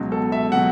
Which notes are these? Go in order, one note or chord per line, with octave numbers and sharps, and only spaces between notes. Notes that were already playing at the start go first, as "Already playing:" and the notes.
Already playing: C#2 B2 F#3
A4
E5
B2 F#3 F#5